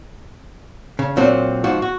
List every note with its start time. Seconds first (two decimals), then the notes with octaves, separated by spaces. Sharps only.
0.99 C#3
1.17 A#2 F#3 C4 D4
1.64 G#2 F3 F#4
1.82 F#4